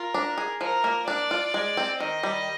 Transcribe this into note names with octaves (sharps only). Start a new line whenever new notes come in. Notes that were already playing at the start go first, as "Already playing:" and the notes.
Already playing: F4 A#4
D4
G#4
F3 A#4
A#3
D4 D5
F4
G#3
C4
D#3 D#5
G3